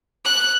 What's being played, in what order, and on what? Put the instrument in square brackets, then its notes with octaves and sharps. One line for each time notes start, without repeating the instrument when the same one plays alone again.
[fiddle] F#6